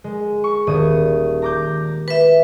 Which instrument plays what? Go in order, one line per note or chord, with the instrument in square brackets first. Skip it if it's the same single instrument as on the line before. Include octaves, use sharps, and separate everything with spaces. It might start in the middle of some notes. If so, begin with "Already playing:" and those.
[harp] G#3
C#6
D#1 D#6 D#7
A#5 D6 G6
[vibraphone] B4 E5